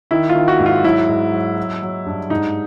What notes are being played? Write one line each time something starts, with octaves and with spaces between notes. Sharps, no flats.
D#3 E4
F4
D#3
F#4
G#2
F4
F#3 E4
G#2
F#3
F#3
F#3
G2
G#2 D#4